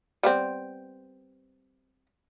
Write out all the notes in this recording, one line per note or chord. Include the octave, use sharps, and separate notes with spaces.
G3 B3 C4